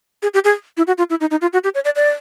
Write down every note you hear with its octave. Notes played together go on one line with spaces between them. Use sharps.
G#4
G4
G#4
E4
F#4
F4
E4
D#4
D#4
F4
F#4
G4
C#5
D5
D5